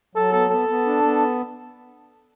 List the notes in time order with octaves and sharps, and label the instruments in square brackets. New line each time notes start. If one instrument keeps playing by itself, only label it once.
[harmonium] F#3 [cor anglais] A4
[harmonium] B3 [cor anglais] A4
[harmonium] B3 [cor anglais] A4
[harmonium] B3
D4
B3